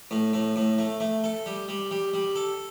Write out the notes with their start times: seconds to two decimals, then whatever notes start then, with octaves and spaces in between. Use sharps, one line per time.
0.11 A2
0.33 A2
0.56 A2
0.78 A3
1.00 A3
1.24 A4
1.46 G3
1.68 G3
1.91 G3
2.13 G3
2.36 A4